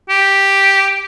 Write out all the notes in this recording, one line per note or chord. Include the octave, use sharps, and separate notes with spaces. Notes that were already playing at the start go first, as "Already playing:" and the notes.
G4